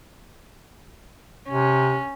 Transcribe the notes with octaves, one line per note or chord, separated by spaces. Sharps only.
C3 C#4